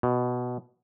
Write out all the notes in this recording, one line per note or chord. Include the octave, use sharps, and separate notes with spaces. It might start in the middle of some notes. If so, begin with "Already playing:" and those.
B2